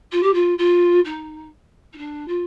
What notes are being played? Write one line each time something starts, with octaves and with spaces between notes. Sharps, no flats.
F4
G4
F4
F4
D#4
D#4
D4
F4